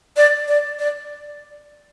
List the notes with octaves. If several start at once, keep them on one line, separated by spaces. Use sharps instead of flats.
D5
D5
D5